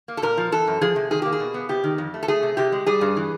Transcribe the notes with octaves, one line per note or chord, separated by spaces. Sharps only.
A#3
A4
A#2 A#4
F3
E3 A4
F#2
F3 G#4
C3
D#3 G#4
A#3 G4
G#4
B2
B3
C3 G4
D#3
F2
A3
A4
A3 G#4
C3
C3 G4
G#3
G3 G#4
G2
E3